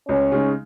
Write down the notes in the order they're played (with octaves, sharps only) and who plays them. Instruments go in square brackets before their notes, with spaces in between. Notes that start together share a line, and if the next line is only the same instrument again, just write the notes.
[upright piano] C#2 [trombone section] C#4
[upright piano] C#3 G#3 D#4